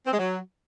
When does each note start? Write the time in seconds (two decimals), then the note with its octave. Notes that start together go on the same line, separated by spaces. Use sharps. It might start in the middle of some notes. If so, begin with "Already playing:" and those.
0.06 C4
0.12 G#3
0.18 F#3